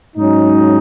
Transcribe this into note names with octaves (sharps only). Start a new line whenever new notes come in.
G#2 F#3 C#4 D#4